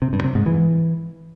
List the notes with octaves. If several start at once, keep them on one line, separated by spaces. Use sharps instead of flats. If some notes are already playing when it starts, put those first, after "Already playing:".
C3
G2
C3
G#2
E3